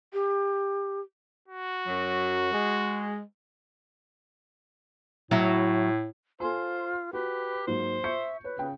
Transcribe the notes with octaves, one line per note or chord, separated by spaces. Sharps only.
G4
F#4
F#2 F#3
G#3
A2 F#3 E4
F4 A4 C5 G#5 C6
F#4 G4 B4
G#2 F#3 A#3 C5
E5 C#6 G6 C#7
B4 C#5
C#3 G5